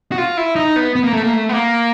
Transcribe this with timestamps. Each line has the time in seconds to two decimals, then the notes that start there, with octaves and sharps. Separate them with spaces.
0.12 F#4
0.18 F4
0.37 E4
0.56 D#4
0.76 B3
0.96 B3
1.04 A#3
1.13 A3
1.23 A#3
1.33 A3
1.49 B3
1.53 A#3